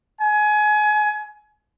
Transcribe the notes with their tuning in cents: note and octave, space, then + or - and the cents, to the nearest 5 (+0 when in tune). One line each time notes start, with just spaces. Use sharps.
G#5 +25